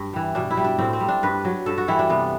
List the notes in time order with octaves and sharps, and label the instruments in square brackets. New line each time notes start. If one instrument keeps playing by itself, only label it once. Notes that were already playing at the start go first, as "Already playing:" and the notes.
Already playing: [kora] G2
E3 G3
B2 D4
E4
G3
D4
A2 C4
C4
G3
D4
G2 B4
F#3
G2 A4
F#4
E3 G3 E4
D4
C3 B3